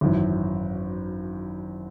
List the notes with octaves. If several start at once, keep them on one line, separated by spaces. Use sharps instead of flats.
G#1 F#2 E3